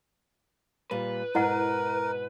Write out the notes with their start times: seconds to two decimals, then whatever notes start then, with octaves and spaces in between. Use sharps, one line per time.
0.91 A#2 G3 B4
1.35 G#2 B2 E4 A#4 D#5 F#5